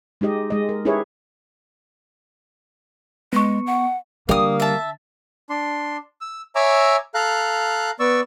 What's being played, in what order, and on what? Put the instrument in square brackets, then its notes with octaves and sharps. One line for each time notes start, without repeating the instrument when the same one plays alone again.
[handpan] G#3 D#4 G4 D#5
G#3 D#5
A#4
D#4 E4 G4 G#4 B4 C#5
[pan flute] G#3 [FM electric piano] B3 C#6
[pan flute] F#5
[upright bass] D3 [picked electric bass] G3 [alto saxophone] A#3 [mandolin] D#6 F6
[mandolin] E5 A5
[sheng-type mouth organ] D4 C6
E6
C#5 E5 G#5 A#5 D6 E6
A4 F5 A#5 F#6
B3 D5 C#6 E6